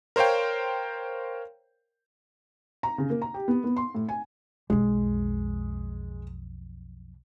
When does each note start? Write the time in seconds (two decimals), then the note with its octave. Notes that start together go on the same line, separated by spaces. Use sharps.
0.16 A#4 C5 C#5 F5 G5
2.83 A#5
2.98 C#3
3.10 A#3
3.22 A#5
3.34 G4
3.48 B3
3.64 B3
3.77 C6
3.95 A2
4.09 G#5
4.70 B1 F2 G#3